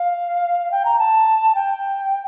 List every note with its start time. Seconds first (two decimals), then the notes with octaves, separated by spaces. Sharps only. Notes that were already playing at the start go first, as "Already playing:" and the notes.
Already playing: F5
0.71 G5
0.85 A#5
0.98 A5
1.54 G5